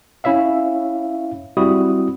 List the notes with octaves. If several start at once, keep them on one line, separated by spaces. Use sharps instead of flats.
C#4 E4 C#5 E5 F5
G3 C4 E4 F#4 D#6